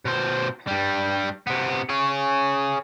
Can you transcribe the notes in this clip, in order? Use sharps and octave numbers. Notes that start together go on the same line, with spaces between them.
B2 C5
G2 G3
C3 B3
G#4 C#5